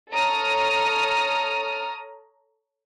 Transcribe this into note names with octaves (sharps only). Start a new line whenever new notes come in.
A4 C#5 A#5 D#6 F6